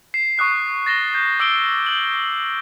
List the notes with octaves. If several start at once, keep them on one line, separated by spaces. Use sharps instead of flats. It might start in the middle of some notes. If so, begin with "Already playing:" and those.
C7 E7
C#6 D#6 F#6 C7
A6 A#6 E7 G7
G6
D6 E6 C7 D7 G7
G6 F#7